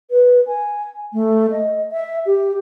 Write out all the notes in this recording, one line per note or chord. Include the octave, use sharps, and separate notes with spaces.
B4
G#5
A3
D#5
E5
G4